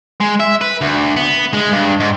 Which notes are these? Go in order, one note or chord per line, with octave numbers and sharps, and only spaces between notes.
G#3
E5
B4
D2
B3
G#3
G2
G#2